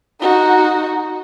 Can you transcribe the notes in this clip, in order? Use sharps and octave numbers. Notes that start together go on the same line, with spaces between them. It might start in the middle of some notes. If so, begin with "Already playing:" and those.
D#4 F#4